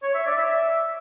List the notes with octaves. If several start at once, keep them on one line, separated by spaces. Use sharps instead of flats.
C#5
E5
D5
E5